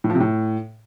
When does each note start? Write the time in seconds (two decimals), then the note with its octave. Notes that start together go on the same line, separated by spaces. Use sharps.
0.04 A2
0.10 F3
0.15 C3
0.20 A2